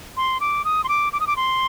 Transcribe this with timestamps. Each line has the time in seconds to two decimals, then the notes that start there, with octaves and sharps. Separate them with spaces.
0.17 C6
0.40 D6
0.65 D#6
0.84 C6
0.89 D6
1.13 D6
1.20 D#6
1.27 D6
1.37 C6